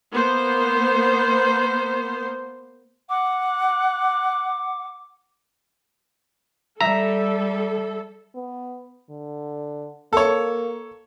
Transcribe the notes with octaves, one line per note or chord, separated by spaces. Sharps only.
A#3 B3 C5
F#5 D6
G3 A4 E5 A#5
B3
D3
A#3 A4 C#5